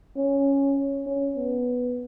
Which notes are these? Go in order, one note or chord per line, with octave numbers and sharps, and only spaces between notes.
C#4
C#4
B3